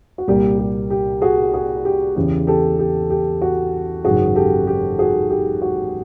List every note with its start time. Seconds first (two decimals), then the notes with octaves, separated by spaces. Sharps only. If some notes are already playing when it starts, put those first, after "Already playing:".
0.18 F#4
0.28 C2 A#2 G3 A#3 G4
0.59 G4
0.90 G4
1.22 F#4 G#4
1.53 F#4 G#4
1.85 G4
2.16 E2 C#3 E3 G4
2.47 G4 A4
2.79 G4
3.10 G4
3.42 F#4
4.05 G#1 F#2 C#3 F#4 G#4
4.35 G4 A4
4.67 G4
4.99 F#4 G#4
5.30 G4
5.62 F#4